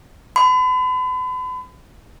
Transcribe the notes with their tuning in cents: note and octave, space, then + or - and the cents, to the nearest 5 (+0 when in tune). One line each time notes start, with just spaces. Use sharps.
B5 +40